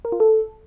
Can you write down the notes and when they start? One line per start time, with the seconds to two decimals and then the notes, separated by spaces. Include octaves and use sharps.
0.05 A#4
0.12 F4
0.20 A4